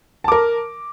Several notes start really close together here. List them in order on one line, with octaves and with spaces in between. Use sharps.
A5 D6 A#4